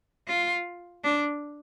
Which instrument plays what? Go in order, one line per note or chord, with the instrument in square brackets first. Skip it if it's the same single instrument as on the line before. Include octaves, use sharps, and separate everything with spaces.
[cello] F4
D4